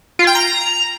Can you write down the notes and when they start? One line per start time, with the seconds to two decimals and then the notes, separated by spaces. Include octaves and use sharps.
0.19 F4
0.27 G5
0.35 A#5